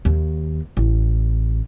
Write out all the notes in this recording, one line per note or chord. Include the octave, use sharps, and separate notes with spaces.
D#2
A1